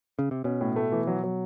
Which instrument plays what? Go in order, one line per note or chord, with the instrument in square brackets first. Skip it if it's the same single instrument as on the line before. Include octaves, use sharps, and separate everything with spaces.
[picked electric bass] C#3
C3
[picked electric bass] B2 [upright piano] C#4
[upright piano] A2
A3
E3
F#3
F#3